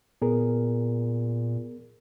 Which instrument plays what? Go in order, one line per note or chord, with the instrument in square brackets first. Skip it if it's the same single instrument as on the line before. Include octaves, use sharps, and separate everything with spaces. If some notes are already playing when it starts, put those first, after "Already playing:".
[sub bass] A#2 [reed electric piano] B3 G#4 A#4